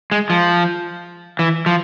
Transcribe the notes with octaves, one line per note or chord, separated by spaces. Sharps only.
G#3
F3
E3
F3